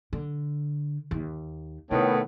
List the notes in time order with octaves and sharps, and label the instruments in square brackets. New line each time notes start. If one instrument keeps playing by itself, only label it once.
[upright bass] D3
D#2
[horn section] A2 D#3 B3 [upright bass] C3